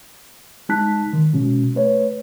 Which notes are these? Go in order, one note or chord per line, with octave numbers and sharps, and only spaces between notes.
G#3 D#4 A5 F#6 B6
D#3
B2 G#3 C#4
A3 B4 C#5